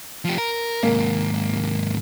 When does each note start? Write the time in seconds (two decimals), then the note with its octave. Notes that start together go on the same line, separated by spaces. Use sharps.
0.25 F3 G4
0.38 A#4
0.83 D#2 G#2 A#3